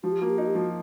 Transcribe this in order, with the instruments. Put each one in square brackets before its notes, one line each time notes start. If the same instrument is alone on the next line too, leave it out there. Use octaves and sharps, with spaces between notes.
[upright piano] F3 [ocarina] F#4
[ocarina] G4
[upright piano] A#3 [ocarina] F#4
[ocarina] G4
[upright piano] D#4 [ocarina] F#4
[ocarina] G4
[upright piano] F3 [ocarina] F#4